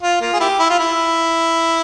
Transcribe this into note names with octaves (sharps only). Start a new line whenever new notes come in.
F4
A#3 F4
G#4
E4 G4
E4
F4
E4